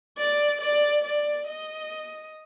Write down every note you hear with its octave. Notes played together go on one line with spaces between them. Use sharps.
D5
D5
D5
D#5